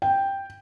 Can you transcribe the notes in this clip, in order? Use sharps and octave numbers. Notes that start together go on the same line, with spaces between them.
G5